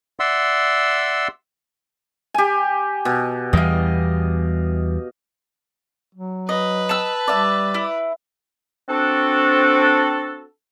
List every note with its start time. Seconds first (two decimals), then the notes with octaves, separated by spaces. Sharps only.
0.20 D5 E5 F#5 C6 E6
2.34 G4 G#5
3.05 B2
3.53 E2 E3 G3 D#5 F5
6.15 F#3
6.49 B4 D#5
6.89 A5 E6
7.28 G3 D5 E5
7.74 E4
8.89 C4 D4 F#4 A4